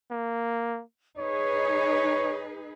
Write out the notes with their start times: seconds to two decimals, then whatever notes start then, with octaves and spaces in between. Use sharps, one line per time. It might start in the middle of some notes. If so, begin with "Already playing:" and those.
0.11 A#3
1.18 D#4 G#4 B4 C#5